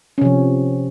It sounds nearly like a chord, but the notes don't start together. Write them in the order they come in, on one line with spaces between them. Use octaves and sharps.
C#4 C3 F3